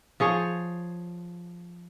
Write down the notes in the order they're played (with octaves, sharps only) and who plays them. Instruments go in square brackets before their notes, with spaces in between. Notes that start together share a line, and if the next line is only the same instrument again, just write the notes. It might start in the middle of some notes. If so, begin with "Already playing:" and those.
[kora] F3 G#4 C#5